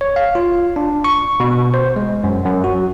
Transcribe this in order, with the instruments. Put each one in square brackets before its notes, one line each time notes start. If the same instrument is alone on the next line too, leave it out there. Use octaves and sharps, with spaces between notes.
[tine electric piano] C#5
F5
F4
D4
C#6
B2
C5
G#3
F#2
F#2
F#4